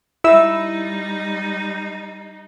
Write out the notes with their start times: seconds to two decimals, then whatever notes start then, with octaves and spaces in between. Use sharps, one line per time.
0.24 G3 D#4 E4 E6